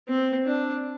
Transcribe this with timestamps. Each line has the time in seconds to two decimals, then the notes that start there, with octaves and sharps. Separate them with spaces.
0.08 C4
0.46 D4